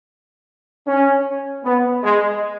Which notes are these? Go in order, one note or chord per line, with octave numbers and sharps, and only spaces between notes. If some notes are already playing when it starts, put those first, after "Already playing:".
C#4
B3
G#3